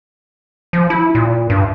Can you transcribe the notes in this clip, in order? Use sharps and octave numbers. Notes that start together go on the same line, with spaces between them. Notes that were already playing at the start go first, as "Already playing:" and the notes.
F3
E4
A#2
G2